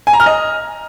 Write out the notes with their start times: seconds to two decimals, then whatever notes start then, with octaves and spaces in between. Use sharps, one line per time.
0.07 G#5
0.13 A#5
0.20 F6
0.26 D#5